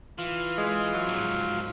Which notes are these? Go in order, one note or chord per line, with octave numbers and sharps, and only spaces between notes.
E3 F4
G#3
F#3
G#2 F3